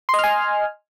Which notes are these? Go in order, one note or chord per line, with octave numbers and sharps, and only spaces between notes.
D#5 G#5 C6 F6